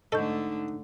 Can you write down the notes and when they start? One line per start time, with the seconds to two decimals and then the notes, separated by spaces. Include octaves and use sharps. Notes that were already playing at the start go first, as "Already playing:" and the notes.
0.12 G#2 D3 A3 D#4 A4 D#5 C#6 G6